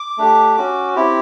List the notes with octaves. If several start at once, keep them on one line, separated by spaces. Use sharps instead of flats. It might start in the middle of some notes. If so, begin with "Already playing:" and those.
Already playing: D6
A3 D4 G4
C#4 F#4
C4 E4 G4